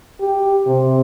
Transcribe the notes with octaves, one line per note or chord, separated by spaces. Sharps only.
G4
C3